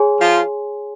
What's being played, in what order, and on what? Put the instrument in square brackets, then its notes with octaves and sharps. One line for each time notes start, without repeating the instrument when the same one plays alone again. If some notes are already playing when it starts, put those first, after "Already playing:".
Already playing: [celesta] G#4 C#5 G#5 C6
[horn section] F3 F4